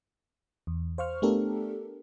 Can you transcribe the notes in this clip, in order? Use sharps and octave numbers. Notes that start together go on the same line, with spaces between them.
E2
C5 F5 C#6 F6
A3 B3 D4 G4 A4 A#4